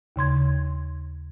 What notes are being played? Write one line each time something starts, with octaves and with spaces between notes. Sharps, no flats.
D#2 C#3 C6 G#6